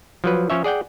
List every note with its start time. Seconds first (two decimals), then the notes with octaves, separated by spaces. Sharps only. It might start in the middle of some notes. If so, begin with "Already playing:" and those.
0.24 F3 F#3 B4
0.50 F3 C#4 C#5 E5
0.64 G#4 D5 F#5 G5